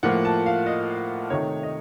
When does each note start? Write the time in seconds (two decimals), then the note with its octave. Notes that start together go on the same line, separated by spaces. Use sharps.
0.03 A2 F3 A#3 F#5
0.25 A5
0.46 F5
0.66 D#5
1.30 C3 D#3 A3 D#4 C#5
1.63 D#5